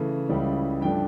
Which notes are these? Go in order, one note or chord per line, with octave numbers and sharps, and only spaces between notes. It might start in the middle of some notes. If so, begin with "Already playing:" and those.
Already playing: C#3 E3 A3
C#2 C#3 G3 C#4 E4
G2 F3 A3 D4 G5